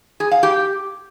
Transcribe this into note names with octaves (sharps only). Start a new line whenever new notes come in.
G#4
F5
G4